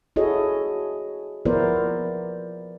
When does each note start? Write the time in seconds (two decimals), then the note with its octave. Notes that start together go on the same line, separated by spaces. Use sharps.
0.16 E4 F#4 G#4 A4 C#5 D#5
1.45 F3 B3 E4 A#4 C5 D5